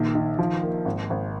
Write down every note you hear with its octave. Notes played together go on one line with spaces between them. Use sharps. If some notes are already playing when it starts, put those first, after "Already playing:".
Already playing: A#1 D#3
D#3
F3
A#3
G#1
G#1